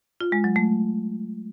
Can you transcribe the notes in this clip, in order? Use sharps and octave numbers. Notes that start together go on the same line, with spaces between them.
F4
G#3
F#3
A3